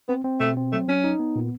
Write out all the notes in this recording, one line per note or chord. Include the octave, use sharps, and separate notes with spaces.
B3 C4
C4
B2 A3
C4
F#3 A3
F#3 C#4
D#4
B3
A#2